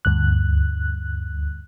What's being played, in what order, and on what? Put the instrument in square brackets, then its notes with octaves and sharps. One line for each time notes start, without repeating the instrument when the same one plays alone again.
[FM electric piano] D2 G2 F#6